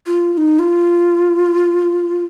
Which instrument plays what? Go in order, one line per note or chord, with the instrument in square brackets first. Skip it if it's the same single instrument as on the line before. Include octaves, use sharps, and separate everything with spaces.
[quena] F4
F4
D#4
F4